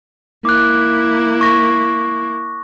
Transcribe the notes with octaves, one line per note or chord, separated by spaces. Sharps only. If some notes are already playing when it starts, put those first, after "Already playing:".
A#3 E4 D6 F#6
C#6 A#6